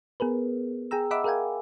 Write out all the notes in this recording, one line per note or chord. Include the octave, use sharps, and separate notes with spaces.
B3 G#4 A#4 B4
G#4 G5 A#5 E6
D#5 E5 F#5 B5 D6 E6
G#4 A#4 F5 G5 G#5